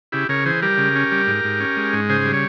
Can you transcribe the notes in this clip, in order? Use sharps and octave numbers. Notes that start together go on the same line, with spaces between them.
C#3 E4 G4
C#3 A#4 C#5
E3 G#4 C5
G3 G4 A#4
C#3
C#4
G3
G#2
G#2
C#4
G#3
G#2
C#3 G#4 C5
G3
C#5